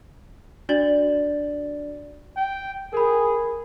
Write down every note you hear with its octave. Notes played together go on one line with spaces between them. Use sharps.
D4 F#4 D5 A6 F#7
G5
G#4 A#4 B5